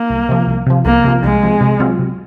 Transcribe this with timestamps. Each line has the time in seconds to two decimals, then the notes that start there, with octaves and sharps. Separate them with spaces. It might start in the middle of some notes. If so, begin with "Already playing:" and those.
Already playing: A#3
0.10 C2
0.29 C3 F3
0.47 C2
0.66 C3 F3
0.85 C2 A#3
1.04 C3 F3
1.24 C2 G#3
1.42 C3 F3
1.61 C3
1.80 F#3 C4 F4
1.99 C3